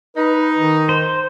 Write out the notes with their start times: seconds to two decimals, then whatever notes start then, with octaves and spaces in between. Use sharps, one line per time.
0.17 D#4 B4
0.58 D#3
0.89 C5